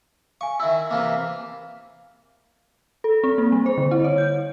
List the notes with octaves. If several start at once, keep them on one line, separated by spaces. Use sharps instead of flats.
F5 G#5 C#6
D#3 E4 E5 E6
C3 E3 A#3
A4
C4
A#3
G3
C5
D3
E4
C#5
G6